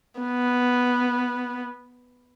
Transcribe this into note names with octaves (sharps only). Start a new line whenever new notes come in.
B3